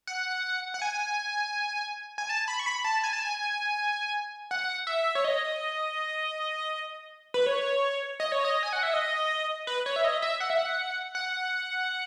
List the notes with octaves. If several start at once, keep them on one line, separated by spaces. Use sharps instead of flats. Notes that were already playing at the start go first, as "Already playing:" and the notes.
F#5
F#5
G#5
G#5
A5
B5
C#6
B5
A5
G#5
A5
G#5
F#5
E5
C#5
D#5
B4
C#5
D#5
C#5
D#5
G#5
F#5
E5
D#5
B4
C#5
E5
D#5
E5
F#5
E5
F#5
F#5